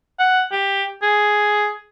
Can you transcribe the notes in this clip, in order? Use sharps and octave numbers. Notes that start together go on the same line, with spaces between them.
F#5
G4
G#4